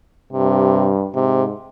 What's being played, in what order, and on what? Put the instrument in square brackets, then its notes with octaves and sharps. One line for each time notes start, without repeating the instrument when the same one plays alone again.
[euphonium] G2 [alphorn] C3
[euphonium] G#2 [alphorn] C3